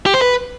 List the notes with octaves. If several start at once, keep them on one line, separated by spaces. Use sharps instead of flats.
G4
C5
B4